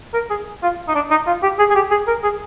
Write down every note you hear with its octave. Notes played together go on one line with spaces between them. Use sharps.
A#4
G#4
F4
D#4
D4
D#4
F4
G4
G#4
G#4
G4
G#4
A#4
G#4